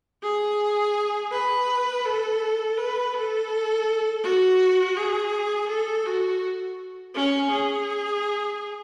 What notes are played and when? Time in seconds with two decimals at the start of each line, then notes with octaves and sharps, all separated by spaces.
0.23 G#4
1.32 B4
2.05 A4
2.78 B4
3.14 A4
4.23 F#4
4.96 G#4
5.69 A4
6.06 F#4
7.15 C#4
7.51 G#4